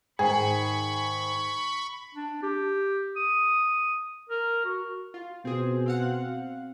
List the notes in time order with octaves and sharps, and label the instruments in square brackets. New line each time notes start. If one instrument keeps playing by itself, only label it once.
[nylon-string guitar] G#2 D#3 [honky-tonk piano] G#4 [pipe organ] B5 C#6
[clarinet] D4
G4
D#6
A#4
F#4
[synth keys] F4
[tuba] B2 [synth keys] C4 G#4
[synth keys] C4 F5 F#5